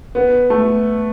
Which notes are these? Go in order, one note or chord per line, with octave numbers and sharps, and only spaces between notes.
B3
A3